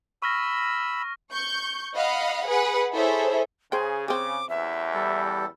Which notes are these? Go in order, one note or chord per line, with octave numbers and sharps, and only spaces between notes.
B5 C#6 E6 F6 A#6
C#6 G6
D#5 F5 F#5 B5
G#4 B4 F#5
E4 G#4 A4 C5 C#5 E5
C#3 G#4 C5 G5
C4 G#4 D6
A1 E2 E5
G3 A4